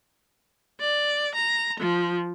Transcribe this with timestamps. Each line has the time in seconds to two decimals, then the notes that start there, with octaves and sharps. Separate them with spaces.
0.79 D5
1.33 A#5
1.79 F3